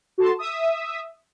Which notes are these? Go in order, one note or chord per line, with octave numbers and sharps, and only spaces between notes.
F#4 A4 A5 C6
E5 D#6